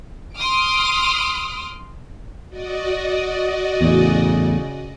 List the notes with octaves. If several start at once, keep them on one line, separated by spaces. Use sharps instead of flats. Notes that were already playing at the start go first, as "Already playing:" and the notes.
C6 D6 D#6 F6 D7
F#4 D5 D#5
E2 A2 C#3